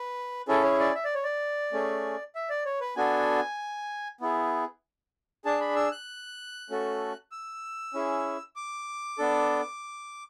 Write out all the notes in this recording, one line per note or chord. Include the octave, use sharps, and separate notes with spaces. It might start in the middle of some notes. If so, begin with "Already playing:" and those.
Already playing: B4
C#4 E4 G#4 A4
C#5
D5
E5
D5
C#5
D5
A3 C#4 G#4
E5
D5
C#5
B4
B3 D4 F#4 A4 G#5
B3 E4 G#4
D4 G#4 A5
B5
E6
F#6
A3 C#4 F#4 A4
E6
C#4 E4 G#4
D6
B3 D4 A4